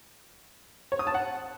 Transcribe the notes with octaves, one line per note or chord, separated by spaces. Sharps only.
C#5
D#6
A5
F#5